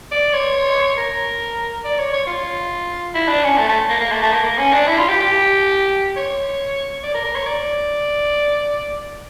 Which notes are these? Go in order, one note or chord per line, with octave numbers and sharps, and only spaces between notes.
D5
C#5
A#4
D5
C#5
C#5
F4
E4
D4
C#4
A3
A3
A#3
A#3
A3
A3
A#3
A#3
C#4
D4
E4
F4
G4
G4
C#5
D5
A#4
A#4
C#5
D5